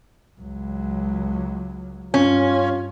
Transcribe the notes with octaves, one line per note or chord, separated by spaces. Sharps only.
C#2 F#3
G2 C#4 F4